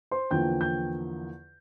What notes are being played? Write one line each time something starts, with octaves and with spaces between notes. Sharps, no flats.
C5 C6
E2 D3 F3 A#3 G5 G6
G5 G6